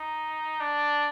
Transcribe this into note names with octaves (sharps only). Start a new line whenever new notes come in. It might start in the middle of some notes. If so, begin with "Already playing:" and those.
Already playing: D#4
D4